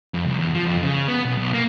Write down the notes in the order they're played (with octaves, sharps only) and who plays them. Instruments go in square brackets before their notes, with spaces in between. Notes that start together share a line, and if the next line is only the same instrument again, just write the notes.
[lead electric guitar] F2
C2
E2
F3
F2
C#3
B3
B1
B1
A#3